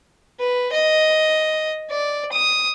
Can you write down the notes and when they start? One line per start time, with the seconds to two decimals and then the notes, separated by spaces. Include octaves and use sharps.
0.39 B4
0.72 D#5
1.91 D5
2.33 D#6